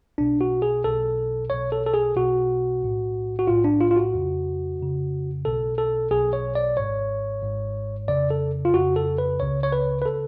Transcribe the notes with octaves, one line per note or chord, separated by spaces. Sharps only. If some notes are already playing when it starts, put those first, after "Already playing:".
B1 B2 D4
F#4
G#4
B1 B2 A4
B1 B2 C#5
A4
A4
G#4
B1 B2 F#4
B1 A2
F#4
B1 A2 F4
D4
F4
F4
F#4
F2 C#3
F2 C#3
B1 B2 A4
A4
B1 B2 G#4
C#5
D5
G#1 G#2 C#5
G#1 G#2
F2 C#3 D5
A4
F4
F2 C#3 F#4
A4
B4
C#2 C#3 C#5
C#5
B4
B4
C#3 A4